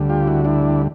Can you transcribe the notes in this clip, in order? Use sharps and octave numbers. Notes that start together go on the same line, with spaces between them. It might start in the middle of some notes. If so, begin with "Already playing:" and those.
Already playing: D2 D3 G3
F4 G4
E4 F#4
D4 E4